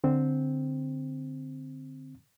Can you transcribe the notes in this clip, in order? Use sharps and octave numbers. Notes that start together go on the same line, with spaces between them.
D3 C4